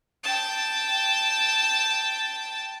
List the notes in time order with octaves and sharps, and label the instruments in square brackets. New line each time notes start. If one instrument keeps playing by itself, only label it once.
[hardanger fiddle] G5 A5